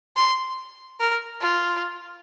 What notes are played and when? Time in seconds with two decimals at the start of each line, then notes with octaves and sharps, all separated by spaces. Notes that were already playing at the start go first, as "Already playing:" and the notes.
0.16 C6
1.00 A#4
1.41 F4